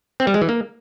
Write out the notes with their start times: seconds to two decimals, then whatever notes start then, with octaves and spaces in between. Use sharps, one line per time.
0.20 C4
0.27 G3
0.34 G#3
0.41 E3
0.49 A#3